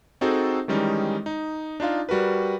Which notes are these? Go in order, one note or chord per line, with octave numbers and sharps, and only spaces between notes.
C4 D#4 F#4 G#4 A4 C5
D#3 E3 G3 G#3 C#4 D#4
D#4
D4 D#4 F4 F5
G3 F#4 A#4 B4